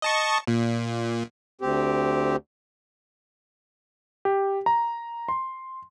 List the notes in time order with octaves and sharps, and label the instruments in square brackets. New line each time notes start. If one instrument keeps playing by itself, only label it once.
[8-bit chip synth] D#5 A5 C#6
A#2
[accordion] D2 C4 G4
[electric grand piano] G4
A#5
C6